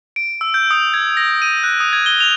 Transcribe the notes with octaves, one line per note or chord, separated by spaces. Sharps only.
D7
E6
G6
D#6
G#6
A#6
D#7
F#6
D#6
G#6
G7
F7